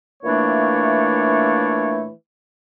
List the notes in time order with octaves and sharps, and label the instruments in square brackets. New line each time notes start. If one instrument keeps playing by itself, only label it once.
[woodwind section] A#2 E3 A3 A#3 D4 C#5